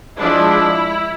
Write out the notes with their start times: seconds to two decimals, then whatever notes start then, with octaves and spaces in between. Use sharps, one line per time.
0.19 F3 G#3 D4 E4